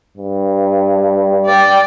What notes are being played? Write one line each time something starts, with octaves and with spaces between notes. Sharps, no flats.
G2
D5 G5